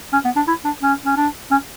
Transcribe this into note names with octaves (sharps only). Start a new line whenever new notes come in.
C#4
B3
D4
E4
D4
C#4
C#4
D4
C#4